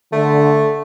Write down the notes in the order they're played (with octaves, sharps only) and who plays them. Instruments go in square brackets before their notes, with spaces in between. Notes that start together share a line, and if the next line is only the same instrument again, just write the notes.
[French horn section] D3 [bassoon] A3